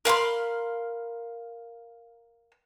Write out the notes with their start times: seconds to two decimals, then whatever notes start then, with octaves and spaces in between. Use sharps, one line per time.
0.05 A#4 F5 B5 C6